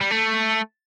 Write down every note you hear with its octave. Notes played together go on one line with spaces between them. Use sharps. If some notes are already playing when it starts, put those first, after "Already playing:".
G3
A3